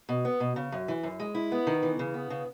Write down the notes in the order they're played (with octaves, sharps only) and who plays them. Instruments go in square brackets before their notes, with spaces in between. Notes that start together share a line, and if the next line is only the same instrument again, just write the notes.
[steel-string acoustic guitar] B2
B3
B2
C#3
F#2
E3
F#2
G#3
E4
B3
D#3
E3
C#3
B3
C#3